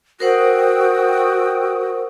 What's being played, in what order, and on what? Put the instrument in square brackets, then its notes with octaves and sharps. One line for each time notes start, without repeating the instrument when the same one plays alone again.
[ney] F#4 [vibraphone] A#4 C5 F#5 [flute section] G5 D#6 E6